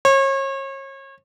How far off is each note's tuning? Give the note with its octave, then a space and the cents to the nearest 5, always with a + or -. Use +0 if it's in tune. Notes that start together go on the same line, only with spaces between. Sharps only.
C#5 -35